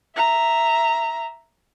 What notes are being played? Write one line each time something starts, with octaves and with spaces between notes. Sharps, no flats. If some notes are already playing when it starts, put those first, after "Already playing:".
E5 A#5